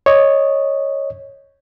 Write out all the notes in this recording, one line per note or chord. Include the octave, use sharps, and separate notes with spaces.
C#5 D#5